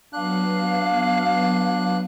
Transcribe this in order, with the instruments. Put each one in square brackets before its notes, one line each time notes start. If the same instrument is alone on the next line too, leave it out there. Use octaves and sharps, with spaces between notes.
[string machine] F#3 B3 [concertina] D4 F#6 [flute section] F5